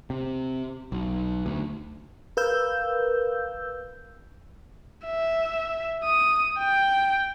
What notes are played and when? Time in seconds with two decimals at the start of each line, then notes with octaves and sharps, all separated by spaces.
0.10 C3
0.92 B1
1.46 D2
2.37 A#4 B4 F5 E6 G6
5.06 E5
6.04 D#6
6.59 G5